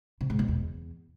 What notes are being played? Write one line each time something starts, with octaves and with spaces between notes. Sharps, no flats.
C3
G#2
B2
E2